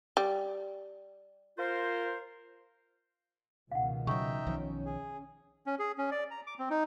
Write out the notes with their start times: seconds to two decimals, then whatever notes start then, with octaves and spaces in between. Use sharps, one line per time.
0.17 G3
1.58 F4 A#4 C5
3.72 C#2 B2 D#3 F5 F#5
4.07 C#3 F#3 D#4 E5 G5 C#6
4.47 B1 D#3 F3 C#4
4.86 G#4
5.66 C#4
5.79 G#4
5.98 C#4
6.11 D5
6.31 A#5
6.47 D6
6.59 C4
6.70 D#4